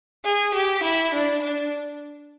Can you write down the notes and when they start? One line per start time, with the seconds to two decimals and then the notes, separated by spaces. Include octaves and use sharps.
0.24 G#4
0.54 G4
0.82 E4
1.13 D4
1.41 D4